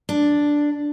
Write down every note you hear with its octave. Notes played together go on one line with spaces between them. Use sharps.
D4